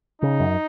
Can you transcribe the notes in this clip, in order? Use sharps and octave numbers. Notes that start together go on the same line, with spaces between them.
C#3 D#4
F#2